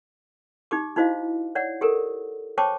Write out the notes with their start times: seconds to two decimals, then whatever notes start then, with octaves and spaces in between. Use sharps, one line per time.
0.71 D#4 G4 D6
0.96 D#4 E4 F#4 C5 D#5 F5
1.55 C#5 D5 F#5
1.81 G4 A4 A#4
2.58 C5 C#5 G5 A5 C#6 D6